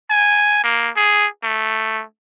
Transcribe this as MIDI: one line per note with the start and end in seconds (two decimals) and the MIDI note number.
0.10 0.63 80
0.64 0.90 58
0.96 1.27 68
1.43 2.03 57